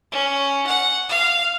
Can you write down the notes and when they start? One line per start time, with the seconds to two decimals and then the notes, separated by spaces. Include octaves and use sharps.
0.12 C#4
0.67 F#5
1.09 F5